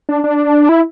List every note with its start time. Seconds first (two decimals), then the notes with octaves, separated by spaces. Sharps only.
0.09 D4
0.24 D4
0.69 E4